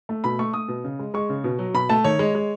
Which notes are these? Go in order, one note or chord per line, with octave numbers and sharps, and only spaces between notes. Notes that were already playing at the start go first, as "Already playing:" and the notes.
A3
B2 B5
A3 C#6
A3 D#6
B2
C#3
G#3
G#3 C#6
C#3
B2
F#3
B2 B5
A3 A5
D#3 C#5
G#3
G#3